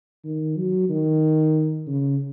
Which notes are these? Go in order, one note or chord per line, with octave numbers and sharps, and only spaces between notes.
D#3
F#3
D#3
C#3